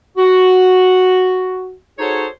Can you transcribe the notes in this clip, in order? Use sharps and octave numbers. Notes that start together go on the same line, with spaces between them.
F#4
D#4 F#4 G#4 A4 C5 C#5